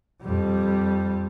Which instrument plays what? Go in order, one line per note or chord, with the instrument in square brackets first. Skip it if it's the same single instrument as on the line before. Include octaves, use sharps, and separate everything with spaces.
[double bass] F2 G3